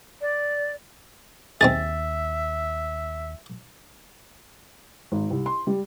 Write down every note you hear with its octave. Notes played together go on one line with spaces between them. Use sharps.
D5
D#2 C4 D#4 G#4 E5 A6
G#1
C2
C6
G3